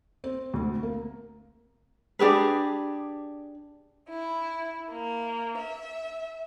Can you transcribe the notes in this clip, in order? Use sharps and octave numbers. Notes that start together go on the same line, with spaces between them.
C4
D2
A#3
D4 G4 G#4 B4
E4
A#3
E5